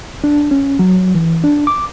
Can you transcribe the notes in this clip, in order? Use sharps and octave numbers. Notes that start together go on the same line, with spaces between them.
D4
C#4
F#3
E3
D4
D6